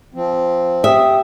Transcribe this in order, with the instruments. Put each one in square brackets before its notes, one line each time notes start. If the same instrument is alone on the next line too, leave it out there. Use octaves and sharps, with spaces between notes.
[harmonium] F3 C4
[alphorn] G4 [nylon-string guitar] E5 [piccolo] D#6